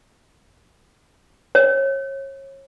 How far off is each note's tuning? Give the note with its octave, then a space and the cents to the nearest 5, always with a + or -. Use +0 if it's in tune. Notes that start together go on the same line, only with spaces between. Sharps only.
C#5 -30